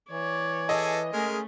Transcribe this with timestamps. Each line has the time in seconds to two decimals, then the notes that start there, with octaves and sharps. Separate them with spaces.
0.12 E3 C#5 D5
0.69 G#4 A4 D#5 G#5
1.13 G#3 A3 C#4 G#4 A#4